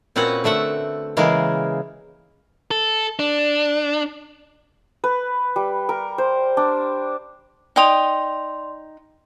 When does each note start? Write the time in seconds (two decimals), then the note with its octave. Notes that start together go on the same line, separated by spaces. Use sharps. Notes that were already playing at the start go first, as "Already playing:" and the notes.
0.16 A#2 C4 C#4 F#4 B4 F#5
0.44 D3 A3 E5 F#5
1.17 C#3 E3 G#3 A#3 A#4
2.71 A4
3.19 D4
5.04 B4
5.56 G3
5.89 A#4
6.18 C5
6.57 D4
7.76 D#4 D5 G5 C6 D#6 F7